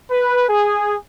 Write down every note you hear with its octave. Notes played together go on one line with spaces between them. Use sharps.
B4
G#4